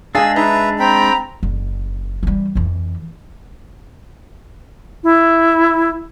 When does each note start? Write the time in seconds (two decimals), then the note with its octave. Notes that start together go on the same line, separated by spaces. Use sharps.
0.15 G#3 D4 G#4 F5 G#5 E6
0.36 D#4 B4 E5 A#5
0.80 C4 G5 A#5 B5
1.43 F#1
2.23 E3 G3
2.55 F2 E3
5.04 E4